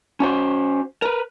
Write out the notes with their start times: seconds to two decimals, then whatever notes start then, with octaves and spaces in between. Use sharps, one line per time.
0.20 C#4 F#4 C5
1.02 A#4 B4